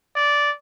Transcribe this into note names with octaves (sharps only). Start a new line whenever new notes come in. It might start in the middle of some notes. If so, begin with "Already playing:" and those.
D5